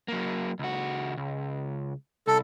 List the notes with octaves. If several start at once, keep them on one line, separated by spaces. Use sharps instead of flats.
F#3 A#3
C#2 F#4
C#2
C2 A4